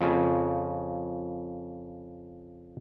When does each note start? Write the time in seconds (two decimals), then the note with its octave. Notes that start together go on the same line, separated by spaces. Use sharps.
0.01 F2 C#3